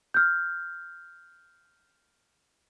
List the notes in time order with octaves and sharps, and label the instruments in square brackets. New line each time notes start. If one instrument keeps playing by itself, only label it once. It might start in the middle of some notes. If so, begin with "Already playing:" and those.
[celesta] F6 G6